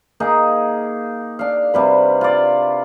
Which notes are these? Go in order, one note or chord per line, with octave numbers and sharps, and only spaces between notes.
A#3 D#4 G#4
D4 F5
C3 G3 B4
F4 D5